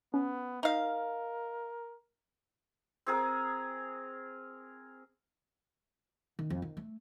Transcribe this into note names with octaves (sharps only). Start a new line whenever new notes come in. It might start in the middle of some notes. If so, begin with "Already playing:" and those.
B3 C#4
D#4 A#4 F5
C4 G#4 A#4
D#3
F2
D#3
A3